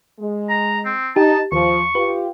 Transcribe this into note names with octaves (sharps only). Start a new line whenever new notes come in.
G#3
A#5
C4
D#4 G4 A5
D#2 F3 C#6
F4 G4 B4